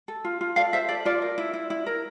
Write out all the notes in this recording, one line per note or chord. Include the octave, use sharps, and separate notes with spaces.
A4
F4
F4
A4 D5 F5
A4 C5 E5
A4 D5
F4 D5
A#4
E4
E4
E4
A#4